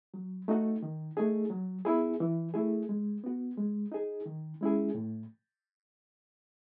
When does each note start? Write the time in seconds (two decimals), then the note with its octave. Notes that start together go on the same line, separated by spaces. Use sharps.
0.14 F#3
0.48 A3 D#4 F#4
0.83 D#3
1.17 A3 D#4 G#4
1.50 F#3
1.85 B3 E4 G#4
2.20 E3
2.54 A3 E4 G#4
2.89 G#3
3.24 B3 F#4
3.57 G#3
3.92 D#4 G#4
4.26 D#3
4.61 G#3 C#4 E4 G#4
4.95 A2